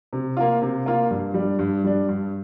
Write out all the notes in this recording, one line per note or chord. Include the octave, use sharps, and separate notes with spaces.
C3
A#3 F4
C3
A#3 F4
G2
G3
D4
G2
G3 D4
G2